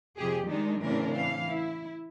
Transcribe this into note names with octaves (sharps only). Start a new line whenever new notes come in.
F2 C3 G4 G#4
D#3 G#3 D4 D#4
A2 C#3 E3 C4 D4 A#4
E3 F5
E4